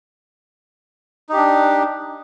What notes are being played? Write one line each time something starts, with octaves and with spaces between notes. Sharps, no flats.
D4 D#4 G4